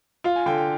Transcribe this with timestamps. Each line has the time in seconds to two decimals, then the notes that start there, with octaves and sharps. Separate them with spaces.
0.24 F4 F5
0.36 G#5
0.46 D3 G5
0.58 G5